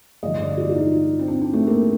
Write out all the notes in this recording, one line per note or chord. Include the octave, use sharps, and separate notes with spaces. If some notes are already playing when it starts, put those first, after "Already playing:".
A1 G2 D3 F3 D#5
D5
F4
F4
D#4
C4
D4
C4
A3
A#3